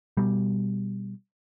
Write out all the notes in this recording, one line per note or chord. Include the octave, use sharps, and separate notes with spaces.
B2 G3